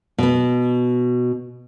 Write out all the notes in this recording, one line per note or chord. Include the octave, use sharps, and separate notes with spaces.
B2 B3